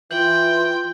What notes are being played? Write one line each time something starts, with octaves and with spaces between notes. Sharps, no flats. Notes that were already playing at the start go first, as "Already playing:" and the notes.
E3 F4 G5 G6 F#7